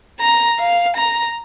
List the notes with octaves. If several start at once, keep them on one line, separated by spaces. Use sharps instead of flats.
A#5
F5
A#5